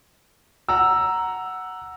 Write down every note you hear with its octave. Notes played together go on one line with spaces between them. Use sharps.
F#5 A#5 E6